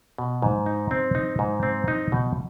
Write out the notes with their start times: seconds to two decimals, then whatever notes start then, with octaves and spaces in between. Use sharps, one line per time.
0.18 B2
0.42 G#2
0.66 D#4
0.91 C4
1.15 D#4
1.39 G#2
1.63 C4
1.88 D#4
2.12 B2